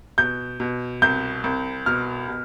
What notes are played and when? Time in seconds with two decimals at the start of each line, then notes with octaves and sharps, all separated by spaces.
0.18 B2 G6
0.60 B2
1.02 C2 G6
1.44 C2
1.86 B2 F6
2.28 B2